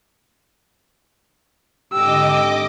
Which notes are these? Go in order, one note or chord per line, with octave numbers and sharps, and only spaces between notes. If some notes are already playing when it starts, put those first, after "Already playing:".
G#1 D3 G4 D#5 D6 E6